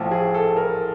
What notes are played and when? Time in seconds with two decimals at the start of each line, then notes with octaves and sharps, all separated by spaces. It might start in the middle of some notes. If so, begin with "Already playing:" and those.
Already playing: A1 A2 F3
0.11 G#4
0.34 A4
0.56 A#4